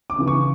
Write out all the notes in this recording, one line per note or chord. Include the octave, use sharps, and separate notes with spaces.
D6
C#3 E3
C#6